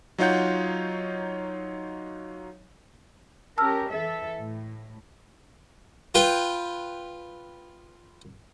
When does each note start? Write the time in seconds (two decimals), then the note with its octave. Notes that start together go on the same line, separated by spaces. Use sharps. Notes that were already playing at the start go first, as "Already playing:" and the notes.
0.18 F#3 D#4 F4 C#5 F#5 G6
3.58 C#4 G4 A#4 A5 E6 F6
3.90 E3 A4 E5
4.40 A2
6.15 F4 B4 G5